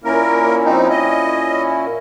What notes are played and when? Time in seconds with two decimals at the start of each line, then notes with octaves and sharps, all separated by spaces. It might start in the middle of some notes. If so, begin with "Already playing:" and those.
0.04 A#2 A#3 C#4 E4 A#4
0.65 F3 C4 D#4
0.90 D#5